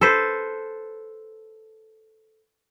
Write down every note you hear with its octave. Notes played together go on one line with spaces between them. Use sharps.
A4 B4 C5